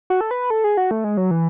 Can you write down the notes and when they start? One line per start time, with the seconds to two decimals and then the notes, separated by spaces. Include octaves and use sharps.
0.10 F#4
0.21 A4
0.31 B4
0.50 A4
0.64 G#4
0.77 F#4
0.91 A3
1.04 G#3
1.17 F#3
1.31 E3